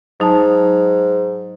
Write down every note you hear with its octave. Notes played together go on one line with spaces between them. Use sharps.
G#2 F#3 D#4 A5